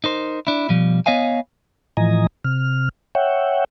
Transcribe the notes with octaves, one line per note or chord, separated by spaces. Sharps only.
D#4 A#4 C5
D4 E4
B2 F3 G3
B3 C#5 D#5 F5 G#5
A2 E3 F3 D#5 G#5 A#5
C3 F6
C#5 E5 F#5 G5